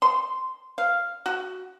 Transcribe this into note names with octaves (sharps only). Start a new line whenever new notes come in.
C6
F5
F#4